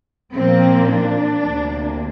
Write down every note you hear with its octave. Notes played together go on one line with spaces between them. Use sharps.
A#2 F3 A#3 C4
D4
D2 C3 A#3